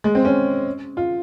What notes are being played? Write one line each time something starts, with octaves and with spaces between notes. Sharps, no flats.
G#3
C4
C#4
F4